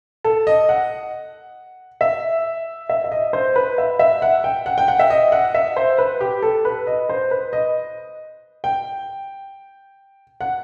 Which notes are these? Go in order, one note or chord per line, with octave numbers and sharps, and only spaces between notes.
A4
D#5
F#5
E5
E5
E5
D#5
C5
B4
E5
E5
F#5
G5
F#5
G5
F#5
E5
D#5
F#5
E5
C5
B4
G4
A4
B4
D#5
C5
B4
D#5
G5
F#5